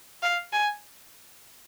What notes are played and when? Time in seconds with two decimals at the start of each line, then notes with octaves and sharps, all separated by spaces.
0.22 F5
0.53 G#5